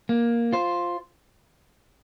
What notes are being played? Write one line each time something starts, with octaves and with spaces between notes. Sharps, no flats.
A#3
F4 C5